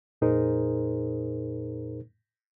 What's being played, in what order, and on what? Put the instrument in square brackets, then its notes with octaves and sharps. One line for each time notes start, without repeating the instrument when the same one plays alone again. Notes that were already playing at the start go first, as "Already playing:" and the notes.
[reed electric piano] F2 A#2 D#4 G#4 A#4 C5